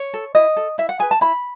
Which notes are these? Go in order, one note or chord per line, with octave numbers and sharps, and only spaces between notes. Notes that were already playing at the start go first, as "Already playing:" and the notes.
Already playing: C#5
A4
E4 D#5
A4
E4 E5
F#5
G#4 B4 G#5
A5
E4 B5